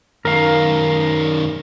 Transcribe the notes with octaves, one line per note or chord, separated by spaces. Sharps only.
F#2 D#3 A#4 F5